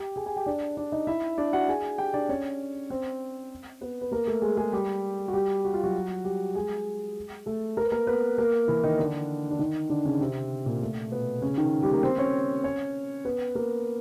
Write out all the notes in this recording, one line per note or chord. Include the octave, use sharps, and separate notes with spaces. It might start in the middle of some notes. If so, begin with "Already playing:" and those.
Already playing: G4 G5
G#4 G#5
G#4 G#5
G4 G5
D4 D5
D4 D5
D#4 D#5
E4 E5
D4 D5
F#4 F#5
G#4 G#5
G4 G5
D4 D5
C#4 C#5
C4 C5
B3 B4
B4
A#3 A#4
A3 A4
G#3 G#4
G#3 G#4
G3 G4
F#4
G3 G4
F#4
F4
F#3 F#4
G3 G4
G#3 G#4
A3 A4
A#4
B4
A#3 A#4
B3 B4
A#3 A#4
E3 E4
D#3 D#4
D3 D4
D4
D#3 D#4
D3 D4
C#3 C#4
C3 C4
A#2 A#3
A3
B2 B3
C#3 C#4
D#3 D#4
G3 G4
A#3 A#4
C4 C5
C#4 C#5
C#4 C#5
B3 B4
A#3 A#4